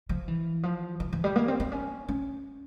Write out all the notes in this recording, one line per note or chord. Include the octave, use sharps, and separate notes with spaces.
F3
E3
F3
E3
E3
G3
A#3
C4
C4
C#4
C#4